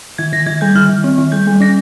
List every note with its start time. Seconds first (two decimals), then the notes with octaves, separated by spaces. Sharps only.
0.18 D#3 G#6
0.33 D#3 A#6
0.46 D#3 G#6
0.61 G3 G6
0.75 D#3 F6
0.89 D#3
1.04 C4
1.18 D#3
1.32 G3 G6
1.47 G3
1.60 C#4 A#6